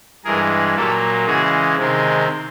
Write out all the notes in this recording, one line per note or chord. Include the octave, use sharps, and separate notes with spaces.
G2 E3 G#3 G#4 A#4
A#2 F#3 A#3 G4 A4
C#3 E3 G#3 F#4 G#4
C3 D#3 G#3 C4